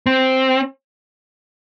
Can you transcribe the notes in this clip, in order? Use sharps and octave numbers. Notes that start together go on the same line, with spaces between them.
C4